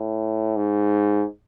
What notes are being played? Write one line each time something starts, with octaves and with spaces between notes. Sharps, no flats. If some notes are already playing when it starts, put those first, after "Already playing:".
Already playing: A2
G#2